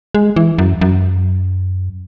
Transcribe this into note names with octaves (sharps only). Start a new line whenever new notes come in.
G#3
E3
F#2
F#2